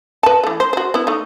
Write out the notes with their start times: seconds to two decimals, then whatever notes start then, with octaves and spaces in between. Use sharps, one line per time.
0.23 B4 A5
0.43 E3 A3
0.60 C5
0.73 F#4 C5
0.94 B3 E4
1.07 A3 D#4